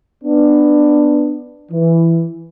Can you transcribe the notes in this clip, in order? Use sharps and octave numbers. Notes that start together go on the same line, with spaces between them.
B3 D4
E3